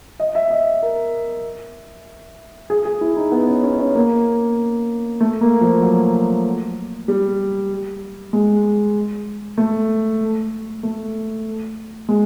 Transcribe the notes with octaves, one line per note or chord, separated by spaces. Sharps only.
D#5
E5
D#5
A#4
G#4
G#4
E4
D#4
B3
C#4
C#4
C#4
A#3
A3
A#3
F3
F#3
G3
G#3
A3
A3
G#3